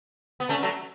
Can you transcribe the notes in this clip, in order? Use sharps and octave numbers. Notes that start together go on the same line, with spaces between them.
B3
A3 C#4
F#3 A3